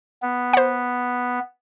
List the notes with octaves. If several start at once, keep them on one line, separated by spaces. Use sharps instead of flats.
B3
C5 F#5